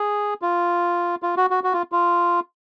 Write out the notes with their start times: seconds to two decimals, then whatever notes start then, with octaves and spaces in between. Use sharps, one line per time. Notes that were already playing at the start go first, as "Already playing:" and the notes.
Already playing: G#4
0.42 F4
1.23 F4
1.37 F#4
1.50 F#4
1.64 F#4
1.73 F4
1.92 F4